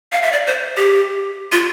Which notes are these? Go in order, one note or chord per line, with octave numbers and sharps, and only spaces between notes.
F5
E5
D5
C5
G4
F4